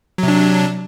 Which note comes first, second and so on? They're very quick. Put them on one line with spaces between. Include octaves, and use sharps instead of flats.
F#3 C3 D4